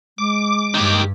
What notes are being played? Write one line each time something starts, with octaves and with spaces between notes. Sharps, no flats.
G#3 D6
G2 D#3 G4